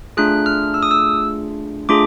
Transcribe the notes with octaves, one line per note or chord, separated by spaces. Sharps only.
A3 D4 F4 G#4 F#6
F6
E6
D#6
E6
A3 D4 F4 G#4 D6